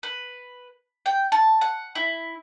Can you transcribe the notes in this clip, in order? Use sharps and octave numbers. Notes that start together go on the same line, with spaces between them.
B4
G5
A5
F#5
E4